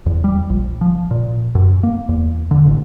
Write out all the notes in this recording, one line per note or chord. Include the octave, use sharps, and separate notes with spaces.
E2
G3
A#1
F3
A#2
F#2
A#3
E2
D3
A1